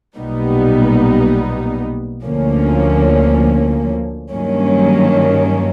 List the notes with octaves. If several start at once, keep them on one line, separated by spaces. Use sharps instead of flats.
B1 A#2 G3 B3 D#4
D2 D3 F3 A#3 C#4
G2 D#3 F#3 A#3 C#4